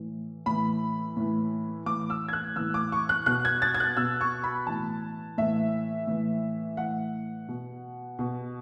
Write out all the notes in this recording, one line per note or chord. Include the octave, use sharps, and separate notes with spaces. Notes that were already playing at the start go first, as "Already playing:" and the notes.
Already playing: A2 E3
A2 E3 B5
A2 E3
A2 E3 D6
E6
G#6
F#6
A2 E3 E6
D6
C#6
F#6
B2 F#6
G#6
A6
G#6
F#6
B2 E6
C#6
B5
A2 E3 A5
A2 E3 E5
A2 E3
A2 E3 F#5
B2
B2